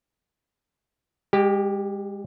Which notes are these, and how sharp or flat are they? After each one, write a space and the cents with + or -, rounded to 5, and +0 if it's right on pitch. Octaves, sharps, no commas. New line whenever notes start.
G#3 -35 G4 +0